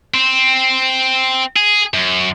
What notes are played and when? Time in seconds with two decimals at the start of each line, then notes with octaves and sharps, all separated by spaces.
0.14 C4
1.57 G#4
1.94 F#2